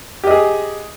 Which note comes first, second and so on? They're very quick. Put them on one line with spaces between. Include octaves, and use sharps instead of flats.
G4 D#5 G#4